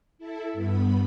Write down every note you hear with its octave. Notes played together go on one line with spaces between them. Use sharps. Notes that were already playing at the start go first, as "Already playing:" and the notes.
E4 A4
G2 B3 B5